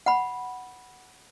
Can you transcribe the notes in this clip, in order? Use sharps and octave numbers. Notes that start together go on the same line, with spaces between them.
F#5 B5